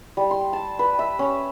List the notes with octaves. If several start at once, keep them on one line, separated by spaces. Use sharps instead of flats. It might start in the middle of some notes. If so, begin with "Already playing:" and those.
G3
C6
A5
B4
E5
C#4